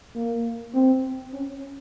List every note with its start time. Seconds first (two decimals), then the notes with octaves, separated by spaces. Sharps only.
0.15 A#3
0.74 C4
1.33 C#4